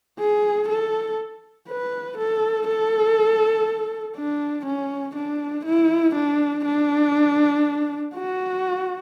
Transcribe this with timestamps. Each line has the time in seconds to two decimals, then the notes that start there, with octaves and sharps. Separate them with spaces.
0.19 G#4
0.69 A4
1.68 B4
2.18 A4
2.67 A4
4.17 D4
4.66 C#4
5.16 D4
5.66 E4
6.15 D4
6.65 D4
8.14 F#4